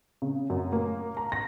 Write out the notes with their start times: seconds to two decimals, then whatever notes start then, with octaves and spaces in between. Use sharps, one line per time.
0.22 C#3
0.50 F#2
0.72 A#3
1.17 A#5
1.32 A#6